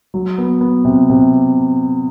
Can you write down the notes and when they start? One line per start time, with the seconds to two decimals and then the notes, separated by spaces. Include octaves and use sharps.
0.14 F#3
0.38 B3
0.61 B3
0.85 C3
1.09 C3